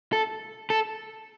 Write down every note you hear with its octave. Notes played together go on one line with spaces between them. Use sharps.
A4
A4